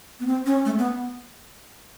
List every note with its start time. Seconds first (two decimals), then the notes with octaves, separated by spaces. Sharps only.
0.20 B3
0.27 C4
0.46 C#4
0.65 A3
0.78 B3